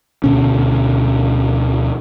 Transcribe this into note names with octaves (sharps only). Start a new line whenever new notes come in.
D2 B2 C#4